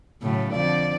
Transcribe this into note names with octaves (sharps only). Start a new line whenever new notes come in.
A2 C#3 F#3
F2 D3 D5